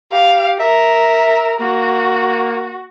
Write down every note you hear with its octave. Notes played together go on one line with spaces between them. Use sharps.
G4 F5
A#4 E5
A#3 F#4